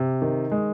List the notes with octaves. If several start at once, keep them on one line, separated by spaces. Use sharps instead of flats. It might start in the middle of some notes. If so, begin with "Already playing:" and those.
Already playing: C3
D#3
G#3